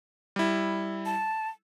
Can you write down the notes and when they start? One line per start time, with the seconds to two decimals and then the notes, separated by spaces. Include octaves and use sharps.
0.36 G3 E4
1.06 A5